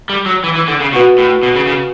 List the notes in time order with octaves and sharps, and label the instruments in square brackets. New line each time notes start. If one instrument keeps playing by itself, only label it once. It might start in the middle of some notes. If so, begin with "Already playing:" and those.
[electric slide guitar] G3
F#3
E3
E3
D3
C#3
[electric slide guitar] B2 [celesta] F#4 B4 F#5 C#6
[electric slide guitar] A2
B2
C#3
C#3